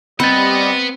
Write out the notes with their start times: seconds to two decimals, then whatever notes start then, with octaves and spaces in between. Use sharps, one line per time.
0.20 G3 C4 B4 D#5 F#5 B5 A6